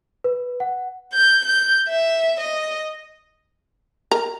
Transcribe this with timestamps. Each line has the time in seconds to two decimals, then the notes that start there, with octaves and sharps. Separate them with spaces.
0.24 B4
0.60 F#5
1.14 G6
1.45 G6
1.89 E5
2.40 D#5
4.11 A#4